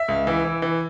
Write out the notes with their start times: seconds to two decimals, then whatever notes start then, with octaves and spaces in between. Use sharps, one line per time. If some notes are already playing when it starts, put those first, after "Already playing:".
Already playing: E5
0.08 C#2
0.27 E3
0.45 E3
0.62 E3